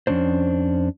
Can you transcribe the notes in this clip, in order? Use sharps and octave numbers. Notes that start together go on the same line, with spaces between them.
F2 E3 C#4 D4 C5